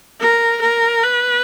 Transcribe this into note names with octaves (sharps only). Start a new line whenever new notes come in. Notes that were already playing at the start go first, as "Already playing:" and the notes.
A#4
A#4
B4